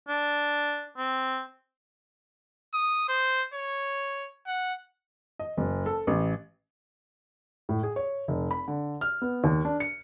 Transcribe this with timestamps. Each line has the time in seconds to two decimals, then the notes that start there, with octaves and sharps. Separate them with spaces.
0.08 D4
0.98 C4
2.74 D#6
3.09 C5
3.54 C#5
4.47 F#5
5.39 D#5
5.57 F#1
5.86 A4
6.07 A1
7.69 A2
7.83 G#4
7.96 C#5
8.28 F1
8.51 B5
8.68 D3
9.01 F6
9.22 B3
9.44 D#2
9.65 D4
9.80 C#7